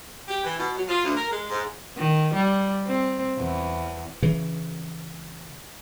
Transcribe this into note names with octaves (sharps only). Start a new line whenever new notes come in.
G4
E3
B2
F#3
F4
D2
A#4
G#3
G#2
D#3
G3
C4
E2
C#3 E3